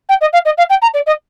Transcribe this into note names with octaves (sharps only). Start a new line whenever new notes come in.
G5
D#5
F5
D#5
F5
G5
A#5
D5
D#5